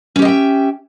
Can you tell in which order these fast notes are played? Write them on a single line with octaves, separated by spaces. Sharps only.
C#4 G4 D#5 G5 E5